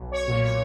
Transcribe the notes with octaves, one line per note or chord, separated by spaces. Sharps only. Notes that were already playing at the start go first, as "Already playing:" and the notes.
Already playing: B1
C#5
A#2
C#5